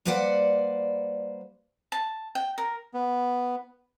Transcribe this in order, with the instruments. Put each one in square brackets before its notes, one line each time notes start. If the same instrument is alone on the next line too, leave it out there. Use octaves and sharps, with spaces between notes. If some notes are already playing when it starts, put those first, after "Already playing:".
[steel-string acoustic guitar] G3 A#3 B4 C5 D5 F#5
[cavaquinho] A5
G5
A#4
[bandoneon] B3